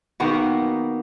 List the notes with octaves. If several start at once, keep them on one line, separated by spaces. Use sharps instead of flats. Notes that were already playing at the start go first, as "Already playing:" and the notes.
D#3 A#3 B3 F#4